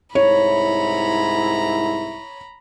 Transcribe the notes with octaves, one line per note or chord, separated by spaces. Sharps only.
C2 G#2 E4 C#5 A#5 B5